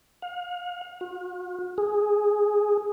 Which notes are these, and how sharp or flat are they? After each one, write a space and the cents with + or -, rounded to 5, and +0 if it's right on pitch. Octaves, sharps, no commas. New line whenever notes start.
F5 +40
F#4 -45
G#4 +0